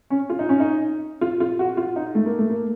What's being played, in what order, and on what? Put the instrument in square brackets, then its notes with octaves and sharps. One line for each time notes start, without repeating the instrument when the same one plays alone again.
[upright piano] C#4
F4
D#4
C#4
D#4
F4
F4
F#4
F4
D#4
A3
A#3
A3
A#3